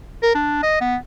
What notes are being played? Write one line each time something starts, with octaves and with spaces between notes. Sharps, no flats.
A#4
D4
D#5
B3